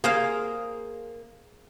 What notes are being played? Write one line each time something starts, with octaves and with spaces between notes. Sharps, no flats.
A#3 G#4 C5 F5